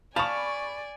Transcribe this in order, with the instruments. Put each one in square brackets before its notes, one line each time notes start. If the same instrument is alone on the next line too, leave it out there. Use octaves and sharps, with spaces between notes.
[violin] D5 G#5 [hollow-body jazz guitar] F5 A5 [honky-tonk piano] B5 C#6